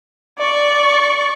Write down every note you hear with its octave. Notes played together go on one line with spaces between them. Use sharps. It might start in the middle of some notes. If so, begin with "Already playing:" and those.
D5 C#6